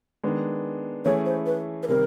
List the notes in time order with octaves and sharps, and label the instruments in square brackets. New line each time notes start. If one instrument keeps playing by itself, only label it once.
[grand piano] D#3 G#3 B3 D4
[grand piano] E3 A3 C#4 E4 G#4 [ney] C#5
[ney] C5
B4
B4
[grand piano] C3 D#3 G3 C4 [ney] A#4